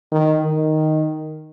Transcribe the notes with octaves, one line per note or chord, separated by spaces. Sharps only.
D#3
D#3